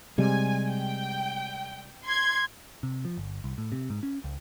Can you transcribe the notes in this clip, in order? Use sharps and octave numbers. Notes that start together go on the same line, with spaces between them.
C3 G3 G#3 G#5
G5
C6 G#6
C3
F3
G1
C2
A2
C3
G#2
C#4
C#2